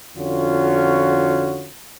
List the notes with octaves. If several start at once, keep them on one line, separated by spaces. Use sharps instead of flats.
F2 D3 C#4 F4 F#4